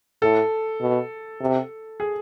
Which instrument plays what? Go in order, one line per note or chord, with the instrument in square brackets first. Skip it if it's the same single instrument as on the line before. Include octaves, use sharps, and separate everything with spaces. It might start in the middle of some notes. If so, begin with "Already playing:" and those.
[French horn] A2 [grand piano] A4
[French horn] B2
C3
[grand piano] G#4